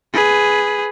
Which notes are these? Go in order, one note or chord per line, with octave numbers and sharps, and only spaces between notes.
G#4 B4